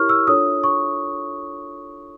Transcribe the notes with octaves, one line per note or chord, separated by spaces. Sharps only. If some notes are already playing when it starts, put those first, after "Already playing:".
Already playing: E4 G4 A#4 C#5 C#6 F6
E6
D4 F4 A4 C#5 D#6
C#6